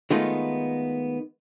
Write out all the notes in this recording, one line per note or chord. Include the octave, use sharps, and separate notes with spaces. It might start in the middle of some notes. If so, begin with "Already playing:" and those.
D#3 G#3 A3 B3 D#4 F4